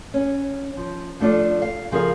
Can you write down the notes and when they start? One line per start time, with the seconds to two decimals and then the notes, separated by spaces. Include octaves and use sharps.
0.14 C#4
0.77 F3
1.20 F3 A3 D4 F4 D5
1.62 F5
1.91 C#3 F3 G#4 A#4 F5